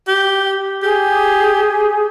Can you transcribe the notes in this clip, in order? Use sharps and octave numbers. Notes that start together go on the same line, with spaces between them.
G4
G4 G#4